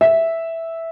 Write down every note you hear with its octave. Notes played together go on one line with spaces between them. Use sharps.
E5